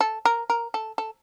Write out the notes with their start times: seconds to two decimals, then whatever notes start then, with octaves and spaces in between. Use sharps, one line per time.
0.01 A4
0.25 A#4
0.50 A#4
0.74 A4
0.98 A4